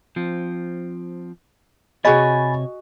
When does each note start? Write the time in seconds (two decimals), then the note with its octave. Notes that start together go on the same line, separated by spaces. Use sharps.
0.16 F3 C4
2.05 C3 F#4 G#4 C#5 D#5 G#5 B5 A6